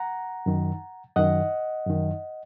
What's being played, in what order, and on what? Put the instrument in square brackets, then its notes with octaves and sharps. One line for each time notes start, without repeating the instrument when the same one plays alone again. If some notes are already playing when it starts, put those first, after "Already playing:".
Already playing: [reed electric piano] F#5 A#5
F#2 D#3
F#2 D#3 D#5 F#5
F#2 D#3